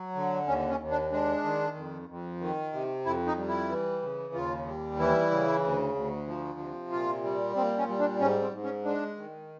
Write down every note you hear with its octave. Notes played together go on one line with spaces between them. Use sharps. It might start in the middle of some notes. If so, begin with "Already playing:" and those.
Already playing: F#3
D3
D#2 C#4
C#4
D#2
D4
G#3 D4
D#3
F2
F2
D#3
C3
F2 E4
D#4
G3
E4
E3
C#3
D#2 F4
G3
E3 E4
C#3
D2
D2
F3
C3
A#2 F4
G3
A#2 C4
C#4
G3
D4
G#2 C#4
C4
G#2
C#4
G#3 D4
D#3